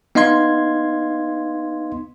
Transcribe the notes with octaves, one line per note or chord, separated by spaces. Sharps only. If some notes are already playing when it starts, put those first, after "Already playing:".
B3 D#4 D#5 F5 C6 G#6